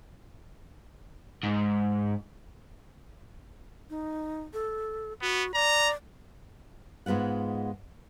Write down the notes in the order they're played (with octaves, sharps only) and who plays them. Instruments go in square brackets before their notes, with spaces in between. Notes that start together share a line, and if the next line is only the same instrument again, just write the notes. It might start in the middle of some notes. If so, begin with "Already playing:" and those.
[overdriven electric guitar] G#2
[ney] D#4
A4
[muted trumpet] B3 [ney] F#4
[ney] D5 [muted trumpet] A#5
[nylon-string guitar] G#2 G#3 B3 F4 F#5